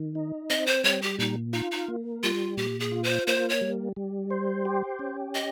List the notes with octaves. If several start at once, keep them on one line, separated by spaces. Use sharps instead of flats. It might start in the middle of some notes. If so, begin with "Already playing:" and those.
Already playing: D#3
D#4
C4 D#5
C5
G3 C#5
G4
A#2 D#4
D#4 F4
D#4
A#3
G3 F4
A#2 G4
G#4
F4
C5
A#3 C5
C#5
G3
G3
C5
G4
C#4
D#5